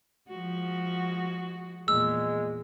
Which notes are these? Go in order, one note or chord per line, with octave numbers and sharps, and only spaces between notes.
F3 G#3 F#4
E2 A#2 G#3 E6